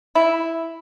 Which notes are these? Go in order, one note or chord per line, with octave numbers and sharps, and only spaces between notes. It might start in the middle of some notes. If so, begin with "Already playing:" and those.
E4